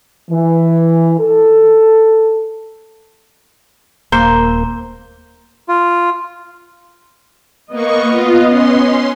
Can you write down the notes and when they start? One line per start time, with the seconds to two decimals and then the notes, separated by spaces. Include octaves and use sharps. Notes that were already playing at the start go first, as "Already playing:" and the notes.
0.31 E3
1.20 A4
4.12 D#1 A#3 C5 A#5
5.69 F4
7.72 A#3 B3 D#5 C#6
8.07 F4
8.46 C#4 C6